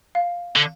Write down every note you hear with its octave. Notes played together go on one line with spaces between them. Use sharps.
F5
D3